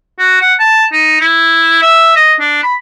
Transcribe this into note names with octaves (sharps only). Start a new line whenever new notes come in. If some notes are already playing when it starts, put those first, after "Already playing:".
F#4
F#5
A5
D#4
E4
E5
D#5
D4
B5